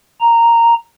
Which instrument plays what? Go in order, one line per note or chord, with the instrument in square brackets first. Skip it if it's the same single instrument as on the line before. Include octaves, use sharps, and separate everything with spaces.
[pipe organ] A#5